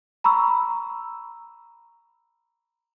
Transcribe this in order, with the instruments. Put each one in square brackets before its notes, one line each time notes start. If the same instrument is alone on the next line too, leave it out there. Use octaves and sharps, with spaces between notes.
[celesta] A#5 B5 C#6 E6